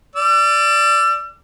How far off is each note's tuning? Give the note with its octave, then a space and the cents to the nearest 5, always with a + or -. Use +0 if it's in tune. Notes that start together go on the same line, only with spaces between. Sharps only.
D5 +0 E6 +40